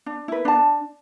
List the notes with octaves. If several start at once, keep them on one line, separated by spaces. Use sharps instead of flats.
D4
E4 B4
D4 A5